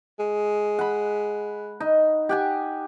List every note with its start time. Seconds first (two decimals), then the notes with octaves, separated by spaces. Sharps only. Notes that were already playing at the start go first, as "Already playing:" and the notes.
0.19 G#3
0.79 F#5 B5
1.80 D#4
2.29 G4 F#5 G#5